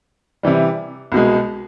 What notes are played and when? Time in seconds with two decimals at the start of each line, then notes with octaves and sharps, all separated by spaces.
0.43 C3 E3 G3
1.12 C2 B2 G#3